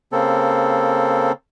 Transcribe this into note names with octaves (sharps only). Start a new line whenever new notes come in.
C#3 A#3 C4 A4